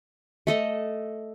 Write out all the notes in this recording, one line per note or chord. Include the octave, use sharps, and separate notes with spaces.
A3 A4 D#5